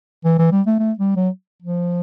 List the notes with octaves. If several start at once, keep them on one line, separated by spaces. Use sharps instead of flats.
E3
E3
G3
A3
A3
G3
F#3
F3